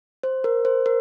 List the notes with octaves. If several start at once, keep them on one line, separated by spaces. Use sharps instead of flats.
C5
A#4
C5
A#4